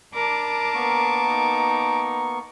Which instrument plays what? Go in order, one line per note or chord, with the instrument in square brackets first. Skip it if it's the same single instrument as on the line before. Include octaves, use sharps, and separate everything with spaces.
[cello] D4 A#4 [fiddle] A5 D6 [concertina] B5
[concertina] A#3 B3 C#6
[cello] D#4